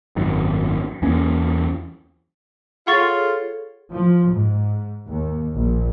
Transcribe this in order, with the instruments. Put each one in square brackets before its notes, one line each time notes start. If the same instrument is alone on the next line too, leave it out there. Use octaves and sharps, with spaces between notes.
[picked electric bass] G#1 F#2 D#3
E2 A#3 C#4
[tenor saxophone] F4 [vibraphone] G#4 A4 C#5 [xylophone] F#5 C#6 A6
[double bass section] F3
G#2
D#2
A#1